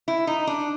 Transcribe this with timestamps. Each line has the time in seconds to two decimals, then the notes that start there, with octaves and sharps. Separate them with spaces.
0.08 E4
0.27 D#4
0.47 D4